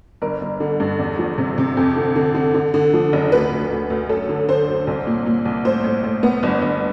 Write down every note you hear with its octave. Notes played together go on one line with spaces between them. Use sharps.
G1 A#4
G1
D3
G2
E2
F3
C3
C3
F2
D3
D3
D3
D3
D3
F3
F#1
D2 B4
D2
D2
D2
F#2 A4
D3
D3 C5
F#2
C2
A#2
A#2
C2
A2 C5
A2
A2
B3
G1
G1